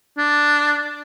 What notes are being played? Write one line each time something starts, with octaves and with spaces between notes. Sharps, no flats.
D4